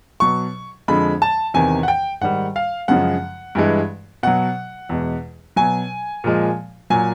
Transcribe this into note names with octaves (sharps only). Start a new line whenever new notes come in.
B2 F#3 C#6
F2 D3 F3 G#3 B5
A5
E2 C3 D#3 G#5
F#5
G5
G#2 D#3 G3 F#5
F5
F#2 C#3 F3 G#3 F#5
G2 E3 G#3
B2 F#3 F#5
E2 B2 G#3
B2 F#3 G#5
A#2 F3 G#3
A#2 F#3 G#5